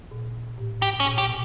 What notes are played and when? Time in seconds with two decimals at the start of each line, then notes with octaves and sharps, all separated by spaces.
0.11 A#2
0.58 A2
0.82 G#2 G4
1.00 C#4
1.07 A#2
1.18 G4
1.29 B2